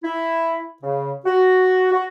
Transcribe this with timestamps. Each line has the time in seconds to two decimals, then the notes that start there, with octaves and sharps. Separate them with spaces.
0.03 E4
0.82 C#3
1.25 F#4
1.91 F#4